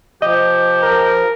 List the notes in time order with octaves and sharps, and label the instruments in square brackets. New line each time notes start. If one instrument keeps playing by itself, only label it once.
[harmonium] F3 [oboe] G4 [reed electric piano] D#5
[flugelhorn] A#4